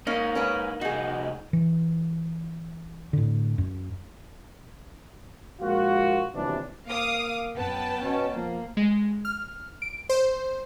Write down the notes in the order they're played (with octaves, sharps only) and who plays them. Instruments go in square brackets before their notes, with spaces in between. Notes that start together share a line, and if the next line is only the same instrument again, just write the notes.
[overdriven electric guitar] G#2 D#4 [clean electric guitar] A#3 [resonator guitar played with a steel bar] C#4
[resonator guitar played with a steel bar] C#4 A#4 B4
[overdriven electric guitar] C2 F#4 [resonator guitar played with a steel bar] D#4 G#4 [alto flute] D#5
[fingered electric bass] E3
A2 D3
F#2
[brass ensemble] A#1 G#3 A#3 F4 F#4
G1 D#2 C3 E3 F#3 D4
[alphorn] A#3 [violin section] F5 D6 D#6
[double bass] F#2 [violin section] B3 G5 A5
[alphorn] B2 [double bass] C#4
[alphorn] F3 [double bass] A#3
[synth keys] G#3
F6
D7
C5